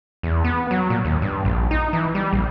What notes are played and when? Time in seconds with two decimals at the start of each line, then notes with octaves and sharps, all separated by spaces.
0.23 E2
0.44 B3
0.71 F#3
0.90 A#2
1.05 D#2
1.22 G2
1.45 A#1
1.71 D#4
1.93 E3
2.15 G3
2.33 A#1